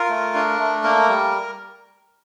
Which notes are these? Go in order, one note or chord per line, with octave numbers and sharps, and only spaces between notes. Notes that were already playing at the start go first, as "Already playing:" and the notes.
Already playing: F4 A#4
A3
D4
A3
A#3 A#4
G3